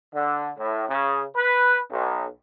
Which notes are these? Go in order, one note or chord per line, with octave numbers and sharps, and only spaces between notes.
D3
A2
C#3
B4
B1